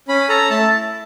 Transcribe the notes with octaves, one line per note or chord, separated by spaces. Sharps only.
C#4 B5
A4 A#5
A3 A5
E4